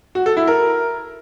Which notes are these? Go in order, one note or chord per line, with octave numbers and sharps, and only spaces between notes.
F#4
A4
E4
A#4